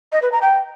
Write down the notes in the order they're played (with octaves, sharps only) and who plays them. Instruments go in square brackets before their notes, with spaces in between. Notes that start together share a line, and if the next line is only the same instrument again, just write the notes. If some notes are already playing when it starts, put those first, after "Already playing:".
[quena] D#5
B4
A#5
G5